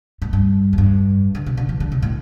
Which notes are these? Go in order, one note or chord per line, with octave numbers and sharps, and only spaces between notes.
A2
G2
E2
G2
D3
B2
D3
E3
D3
B2
A2